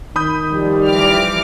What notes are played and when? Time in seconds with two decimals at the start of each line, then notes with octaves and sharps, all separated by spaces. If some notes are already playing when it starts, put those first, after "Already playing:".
0.16 D#3 B5 D#6 G6
0.52 F3 G3
0.86 E3 D6 F6